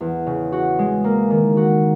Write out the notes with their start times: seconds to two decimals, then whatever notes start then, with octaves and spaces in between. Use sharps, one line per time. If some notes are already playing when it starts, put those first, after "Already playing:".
0.01 E2
0.27 C#3
0.52 F#4
0.79 G#3
1.04 A#3
1.31 D#3
1.57 F#4